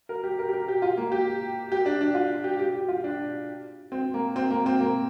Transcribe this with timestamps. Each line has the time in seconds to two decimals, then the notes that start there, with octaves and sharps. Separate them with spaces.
0.09 A#4
0.24 G4
0.39 A#4
0.49 G4
0.54 A#4
0.68 G4
0.82 F4
0.97 A#3
1.12 G4
1.72 G4
1.86 D4
2.01 D4
2.15 F4
2.44 G4
2.59 G4
2.74 G4
2.89 F4
3.04 D4
3.92 C4
4.14 A#3
4.36 C4
4.50 A#3
4.66 C4
4.80 A#3